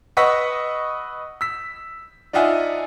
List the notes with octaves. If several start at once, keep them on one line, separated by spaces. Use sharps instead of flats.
B4 D#5 F#5 C#6 E6 B6
E6 B6
D4 D#4 F4 E5 F#5 G#5